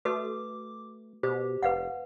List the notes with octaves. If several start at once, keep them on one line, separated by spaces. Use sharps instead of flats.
A3 F#4 A4 B4 D6
B2 G4 C5
F1 B4 F5 F#5